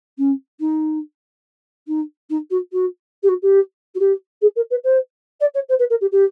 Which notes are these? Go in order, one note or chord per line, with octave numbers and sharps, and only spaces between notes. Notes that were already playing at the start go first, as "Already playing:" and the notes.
C#4
D#4
D#4
D#4
F#4
F#4
G4
F#4
G4
F#4
G4
G#4
A#4
B4
C5
D5
C#5
C5
B4
A#4
G4
G4